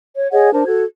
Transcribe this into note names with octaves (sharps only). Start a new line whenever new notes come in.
C#5
G#4 C#5 D#5 F#5
D4 A#4 C5 A5
F#4 A4 G#6